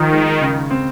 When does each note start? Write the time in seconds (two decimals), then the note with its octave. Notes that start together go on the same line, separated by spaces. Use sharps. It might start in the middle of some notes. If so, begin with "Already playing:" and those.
Already playing: D#3 F3
0.12 G#3
0.41 C#3
0.71 C4